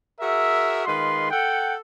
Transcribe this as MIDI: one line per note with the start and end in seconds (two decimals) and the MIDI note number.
0.20 0.86 66
0.20 0.86 68
0.20 0.86 70
0.20 0.86 76
0.86 1.29 51
0.86 1.29 56
0.86 1.29 65
0.86 1.29 71
0.86 1.29 84
1.31 1.75 69
1.31 1.75 78
1.31 1.75 79